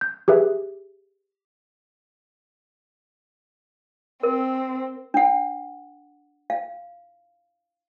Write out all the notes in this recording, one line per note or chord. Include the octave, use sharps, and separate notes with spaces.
G6
G4 G#4 B4 E5
C4 A#4
D4 F#5
F5